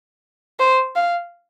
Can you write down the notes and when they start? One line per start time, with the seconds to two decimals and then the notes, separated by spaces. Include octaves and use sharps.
0.59 C5
0.96 F5